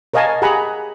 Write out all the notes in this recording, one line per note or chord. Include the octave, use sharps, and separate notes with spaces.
A#4 C#5 D#5 F5 G#5 A5
G4 G#4 F#5 G#5 A#5 B5